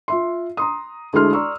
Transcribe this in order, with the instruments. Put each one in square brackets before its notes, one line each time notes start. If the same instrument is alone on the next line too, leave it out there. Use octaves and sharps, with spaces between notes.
[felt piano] F4 E5 C6
A#5 C6 D#6
D2 G#3 E4 A4 C6 F6
D5 A#5 C6 C#6 E6